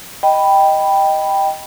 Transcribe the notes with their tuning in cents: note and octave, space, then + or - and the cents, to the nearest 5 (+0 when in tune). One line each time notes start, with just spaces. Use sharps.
D#5 +0 G5 +0 B5 +0